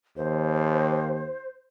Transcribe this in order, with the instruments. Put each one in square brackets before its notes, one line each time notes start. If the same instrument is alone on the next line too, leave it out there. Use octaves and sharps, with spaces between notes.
[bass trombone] D#2 [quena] C5